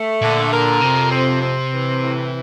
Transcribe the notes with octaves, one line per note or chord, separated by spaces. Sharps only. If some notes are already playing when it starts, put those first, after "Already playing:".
Already playing: A3
A#2 D3
A#4
F2 C3
C4
C4
E3
A2